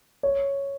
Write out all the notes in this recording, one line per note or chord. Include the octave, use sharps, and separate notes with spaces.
C#5